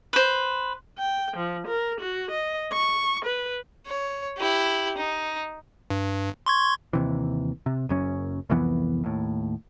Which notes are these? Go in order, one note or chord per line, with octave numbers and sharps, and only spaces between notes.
B4 C5
G5
F3
A#4
F#4
D#5
C#6
B4
C#5
E4 G4
D#4
G2
C6 C#6 G#6
D#2 C3 E3
C3
F#1 F#2 C#4
C2 F2 E3 B3
D#2 A2